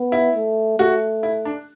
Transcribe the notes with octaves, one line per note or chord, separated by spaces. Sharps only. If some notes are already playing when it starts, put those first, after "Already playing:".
Already playing: B3
E4
A3
A3 F#4
E4
D4